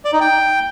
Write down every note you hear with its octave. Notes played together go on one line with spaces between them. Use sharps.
D5
D#4
G5